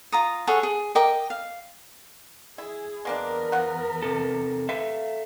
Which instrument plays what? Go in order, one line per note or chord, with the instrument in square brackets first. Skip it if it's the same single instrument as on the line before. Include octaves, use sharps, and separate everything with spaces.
[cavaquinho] F4 A#5 D#6
G#4 A4 C#5 F#5
G#4
A#4 D#5 G5 D6
F5
[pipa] E4 [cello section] G#4
[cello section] E2 A#4 [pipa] G#3 A#3 D4 [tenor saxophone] B3
[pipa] F3 F#5
[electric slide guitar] C3 A4
[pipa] C3 B4 [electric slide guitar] A4 E5 F5